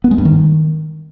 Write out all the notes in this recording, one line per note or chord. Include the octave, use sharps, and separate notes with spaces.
B3
G#3
G2
D#3